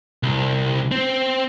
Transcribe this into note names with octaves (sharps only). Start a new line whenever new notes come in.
C2
C4